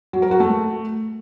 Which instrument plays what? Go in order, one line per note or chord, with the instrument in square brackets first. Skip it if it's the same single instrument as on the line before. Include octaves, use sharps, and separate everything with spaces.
[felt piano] F#3
A#4
F#4
A3